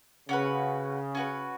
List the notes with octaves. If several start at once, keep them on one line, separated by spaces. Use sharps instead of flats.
C#3 C#4 F#4 B4
C#4 F#4 B4